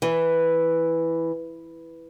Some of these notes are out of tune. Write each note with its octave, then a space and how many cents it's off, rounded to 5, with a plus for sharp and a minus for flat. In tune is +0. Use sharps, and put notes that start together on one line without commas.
E3 +0